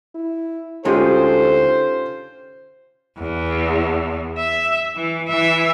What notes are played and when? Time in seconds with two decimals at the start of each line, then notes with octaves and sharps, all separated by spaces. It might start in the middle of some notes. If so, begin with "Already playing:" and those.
0.15 E4
0.85 D2 G#3 C#4 D#4 F4 G4 A4 C5
3.19 E2
4.38 E5
4.96 E3
5.29 E3 E5